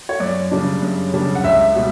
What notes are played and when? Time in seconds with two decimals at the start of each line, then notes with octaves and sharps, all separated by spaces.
0.09 C#5
0.20 F#2 D5
0.51 C#3 G3 D4
0.82 F#2
1.14 C#3 G3 D4
1.35 F#5
1.44 C#2 E5
1.75 B2 G3